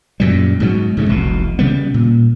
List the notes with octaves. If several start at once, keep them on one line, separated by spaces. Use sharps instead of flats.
F#2 A#2 G3
G#2 B2 F#3
G#2 C#3 F#3 A3
F1 C2 B2
C#3 G3 B3
A#2